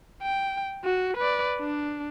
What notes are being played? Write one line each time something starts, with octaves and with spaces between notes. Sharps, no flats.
G5
F#4
B4 D5
D4